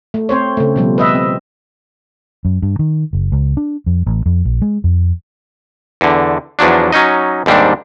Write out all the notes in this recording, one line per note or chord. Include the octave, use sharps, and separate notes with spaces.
A3
C4 C5 C#5
C#3 A3
B2 F3 G3
B4 D#5 E5
C4
F#2
G2
D#3
F#1
C#2
D4
F2
A1
F2
A#1
G#3
F2
E2 D3
E2 F3 F#3 D4
F#3 C#4 D#4 D#5
D#2 G#2 G3 C4 D4